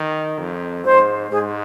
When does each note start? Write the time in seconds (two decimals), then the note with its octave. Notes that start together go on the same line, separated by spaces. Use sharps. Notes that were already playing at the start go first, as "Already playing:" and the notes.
Already playing: D#3
0.39 F2
0.85 G#2 C5
1.31 G#2 G#4